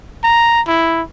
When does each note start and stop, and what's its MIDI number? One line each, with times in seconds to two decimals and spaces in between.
0.24 0.62 82
0.68 1.02 64